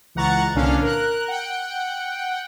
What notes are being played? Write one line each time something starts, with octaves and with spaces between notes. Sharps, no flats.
C#2 E3 F#5 A#5 C#6 A6
C2 A#2 D3 C#4 D4 F5
A#4 F#6
F#5 G5